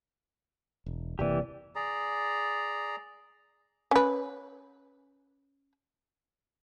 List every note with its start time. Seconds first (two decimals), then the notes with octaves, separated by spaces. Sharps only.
0.86 E1
1.19 F#1 C3 E3 A#3 G4 D5
1.75 G#4 D5 A#5
3.91 C#4 B4